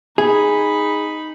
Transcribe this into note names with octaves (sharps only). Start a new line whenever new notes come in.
D#4 G#4 B5